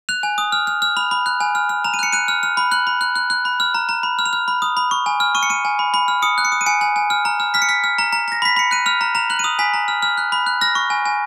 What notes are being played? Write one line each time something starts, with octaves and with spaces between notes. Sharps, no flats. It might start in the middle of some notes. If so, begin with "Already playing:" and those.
F#6 F7
G#5
D#6
F6
F6
F6
B5 F7
B5
F#6
G#5
F6
F6
A#5 F7
D#7
F#6 C#7
F#6 D#7
F6
F6
B5
F#6 F#7
B5
F#6
F#6
F#6
B5
F6
A#5
A#5
B5
F6
F7
F6
B5
D#6
B5
C#6
G#5
F6
C#6 D#7
C#7
C#6 D#7
G#5
B5
B5
F6
D#6 C#7
F#6
C#7
D#6
D#7
G#5 C#7
G#5
G#5
F6
A#5
F6
F6 B6
C#7
F6 B6
F6
A#5
A#5
A#5 A#6
B5 B6
B5 C#7
F#6 D#7
F6 F7
A#5
A#5 F7
F#6 F#7
D#7
D#6 F7
G#5 B6
A#5
F6
F6
F#6
B5
F#6
F6 A#6
C#6
G#5
G#5